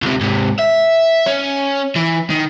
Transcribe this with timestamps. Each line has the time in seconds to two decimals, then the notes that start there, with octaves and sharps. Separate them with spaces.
0.03 C#2 C3
0.21 G#2 C3
0.59 E5
1.27 C#4
1.96 E3
2.30 D#3